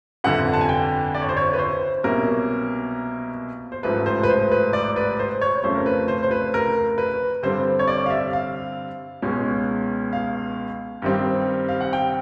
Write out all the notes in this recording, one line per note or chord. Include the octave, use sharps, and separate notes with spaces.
G1 F2 D3 F#5
A5
G#5
G5
D5
C#5
C5
C#5
B4
C5
C2 B2 F#3 A#3 C#4 A#4
C5
A1 G#2 F3 A3 B4
C5
B4
C5
B4
D5
B4
C5
C#5
F2 C#3 F3 A3 C#4 C5
A#4
B4
C5
C5
B4
A#4
B4
G2 D3 G3 C4 C5
C#5
D5
F5
E5
F5
C#2 B2 G#3 C#4
F5
G2 D#3 G3 C4
F5
F#5
G5